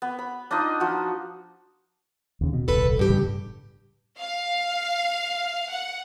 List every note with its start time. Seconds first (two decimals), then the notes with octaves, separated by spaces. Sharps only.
0.02 B3
0.19 B5
0.51 D4 D#4 F4 D#5
0.80 F3 F#4
2.41 D#2 C#3
2.53 B2
2.68 D#1 C2 A4 B4
2.97 E2 G2 G4
3.10 A2 C#3 G3
4.19 F5
5.70 F#5